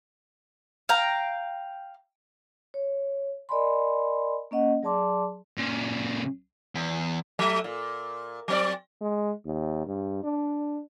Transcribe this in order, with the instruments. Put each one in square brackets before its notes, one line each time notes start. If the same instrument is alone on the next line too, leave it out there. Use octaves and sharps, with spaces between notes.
[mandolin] F5 G5 A#5
[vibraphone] C#5
A#4 D5 D#5 G#5 B5 C6
A#3 C#4 D#5 F#5
F#3 G#4 D5 A5 C6 D6
[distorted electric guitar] A#2 C#3
[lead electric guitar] E2
[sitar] F#3 A3 E5
A#2
F#3 C4 D5
[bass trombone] G#3
D#2
G2
D4